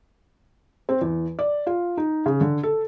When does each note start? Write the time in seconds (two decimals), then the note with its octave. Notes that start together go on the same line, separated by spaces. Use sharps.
0.89 C4
1.01 E2
1.39 D5
1.67 F4
1.97 D#4
2.26 C#3
2.41 D3
2.63 A4